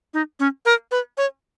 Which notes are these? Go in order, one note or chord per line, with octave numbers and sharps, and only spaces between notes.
D#4
C#4
A#4
B4
C#5